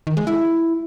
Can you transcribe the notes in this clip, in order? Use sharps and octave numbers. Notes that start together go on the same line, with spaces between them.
D#3
G#3
E4